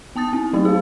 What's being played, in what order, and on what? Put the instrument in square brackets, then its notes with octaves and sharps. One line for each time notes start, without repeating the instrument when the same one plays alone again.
[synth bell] B3 A5 D#6 A6
C4
F#3 A3 B3 D#4
G#4 F5